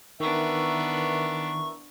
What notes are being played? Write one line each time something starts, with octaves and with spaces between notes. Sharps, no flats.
D#3 E3 B3 D4 A#4 E5 C#6